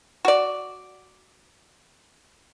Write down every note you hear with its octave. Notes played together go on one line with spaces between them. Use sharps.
F#4 D5